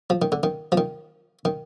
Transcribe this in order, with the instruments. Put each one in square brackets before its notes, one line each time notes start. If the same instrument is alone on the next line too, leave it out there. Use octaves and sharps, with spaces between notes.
[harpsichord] F3
D#3
D3
D#3
F3
D#3
D#3